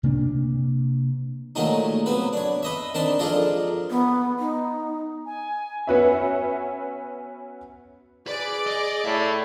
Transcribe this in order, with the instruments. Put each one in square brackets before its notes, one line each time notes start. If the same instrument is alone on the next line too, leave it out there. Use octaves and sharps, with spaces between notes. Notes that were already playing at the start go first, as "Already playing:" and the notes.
[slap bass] C3 A#3 D4
[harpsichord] A#2 D#3 F#3 G#3 A3 D#4
F#3 B3 C4 B4
D4 C#5
B4 D#5 E5
D#3 C4 D4 A5 C6
F3 G#3 D4 F4 A4 A#4
[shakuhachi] B3
D#4
[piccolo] G#5
[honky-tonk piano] B3 C#4 F#4 B4 C#5 E5
[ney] G#4 [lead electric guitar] B4 [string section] D5
[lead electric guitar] D#5
[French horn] A2 [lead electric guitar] A4 E5